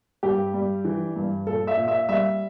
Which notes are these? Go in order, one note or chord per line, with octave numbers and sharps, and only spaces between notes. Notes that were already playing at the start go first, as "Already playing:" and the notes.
G2 G4
G3
E3
G2
A#2 A4
E5
A#2
E5
G3 E5